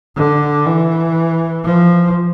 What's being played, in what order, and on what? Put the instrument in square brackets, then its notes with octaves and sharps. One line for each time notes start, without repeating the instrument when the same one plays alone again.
[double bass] D3
E3
F3